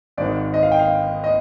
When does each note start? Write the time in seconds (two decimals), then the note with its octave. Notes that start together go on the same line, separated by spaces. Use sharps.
0.18 G#1 G#2 D#3 D5
0.54 D#5
0.63 F5
0.72 G5
0.79 F5
1.24 D#5